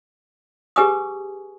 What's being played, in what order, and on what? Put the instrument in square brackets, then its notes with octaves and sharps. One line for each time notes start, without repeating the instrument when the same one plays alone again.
[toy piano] G4 G#4 B4 G#5 C#6 D#6